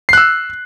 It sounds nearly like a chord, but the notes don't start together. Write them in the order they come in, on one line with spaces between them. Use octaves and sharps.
C7 F#6 E6